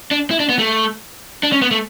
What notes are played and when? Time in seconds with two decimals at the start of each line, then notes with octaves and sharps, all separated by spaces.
0.11 D4
0.31 E4
0.40 D4
0.49 B3
0.59 A3
1.43 D4
1.52 C#4
1.62 B3
1.71 A3